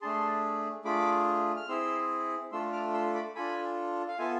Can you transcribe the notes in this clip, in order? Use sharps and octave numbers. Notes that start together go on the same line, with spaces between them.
A3 D4 G#4 A5 C6
A3 D4 F4 G#4 B5 D6
F6
C4 E4 G#4 C6 E6
A3 D4 F4 A4 C6 E6
D6 F6
C6 E6
B5 D6
D4 F4 A4 G#5 B5
F5
B3 F4 A4 E5 G#5